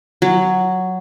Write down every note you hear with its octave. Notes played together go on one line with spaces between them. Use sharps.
F#3